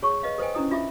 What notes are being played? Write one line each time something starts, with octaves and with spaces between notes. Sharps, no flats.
G#4 C#5 A5 C#6
B4 D#5 F5
A4 B4 C5 D#5 G5 G#5
C#4 D4 E4 D#6
D4 F4 E5 D6